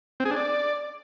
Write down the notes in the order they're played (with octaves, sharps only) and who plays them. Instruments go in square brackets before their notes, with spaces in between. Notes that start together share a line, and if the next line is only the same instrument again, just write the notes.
[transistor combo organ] C4
G#4
D4
D5